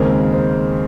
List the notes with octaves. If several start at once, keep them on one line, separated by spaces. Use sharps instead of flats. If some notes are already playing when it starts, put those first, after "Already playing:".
Already playing: D#2 C#3 G#3 C4 A#4
C5